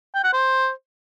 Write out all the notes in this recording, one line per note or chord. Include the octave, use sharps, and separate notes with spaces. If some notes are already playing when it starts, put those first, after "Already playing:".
G5
F#5
C5